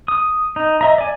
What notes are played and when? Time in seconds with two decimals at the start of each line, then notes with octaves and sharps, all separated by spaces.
0.08 D#6
0.56 D#4
0.81 D#5 E5 A#5
0.98 D5 G#5